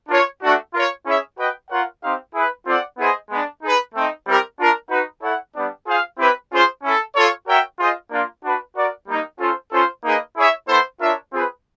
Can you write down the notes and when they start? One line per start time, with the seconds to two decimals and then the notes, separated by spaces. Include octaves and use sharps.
0.09 D4 F4 A#4 C#5
0.42 A3 D4 F#4
0.74 F4 A#4 C#5
1.06 C#4 E4 G#4 C#5 E5
1.38 F#4 B4 D#5 G5
1.70 F4 A#4 C#5 F#5
2.03 C4 D#4 G4 C5 F5
2.35 E4 G#4 B4
2.67 C4 F4 A4 D5 F#5
2.98 B3 E4 G#4 C5 D#5
3.30 G#3 B3 D4
3.63 D#4 G#4 B4
3.94 A3 C4 D#4
4.27 G3 C4 E4 G4 A#4
4.59 D4 F4 A#4
4.90 D#4 F#4 B4
5.22 E4 A4 C#5 F#5
5.55 G3 B3 D4
5.87 F4 G#4 C5 F5
6.19 C4 E4 G4 B4
6.51 C#4 F4 G#4 C5
6.83 C#4 E4 A4
7.16 F4 A4 C#5
7.48 F#4 A#4 C#5 E5 G5
7.79 F4 G#4 C5 D#5
8.11 A#3 D4 F4
8.44 D4 F#4 B4
8.76 F#4 A#4 D5
9.08 G3 A#3 D#4
9.40 C#4 F4 A4 C5
9.72 C#4 F4 A4 C5
10.04 A#3 D#4 G#4 B4 D#5
10.37 E4 G#4 C#5 E5
10.68 B3 E4 A4 C5
11.00 D4 F4 A#4 C#5 E5
11.33 C4 F4 G#4 B4